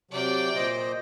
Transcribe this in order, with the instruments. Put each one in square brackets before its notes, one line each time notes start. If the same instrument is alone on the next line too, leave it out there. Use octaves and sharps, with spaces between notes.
[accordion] C3 F#3 [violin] D5 G5
[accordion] A#2 C5 D#5